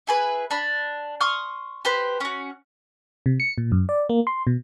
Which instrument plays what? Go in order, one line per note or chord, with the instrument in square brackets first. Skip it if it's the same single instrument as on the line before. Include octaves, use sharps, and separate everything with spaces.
[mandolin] E4 G#4 B4
D4 B5
C6 C#6 D#6 F6
G4 B4 C5
C#4 F#4
[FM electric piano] C3
C#7
A#2
F#2
D5
A#3
C6
B2